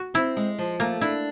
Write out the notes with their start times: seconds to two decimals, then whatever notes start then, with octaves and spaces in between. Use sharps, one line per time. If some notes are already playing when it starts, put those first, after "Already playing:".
Already playing: F#4
0.14 C4 E4
0.37 G#3
0.59 F3
0.80 A3 A#3
1.01 D4 E4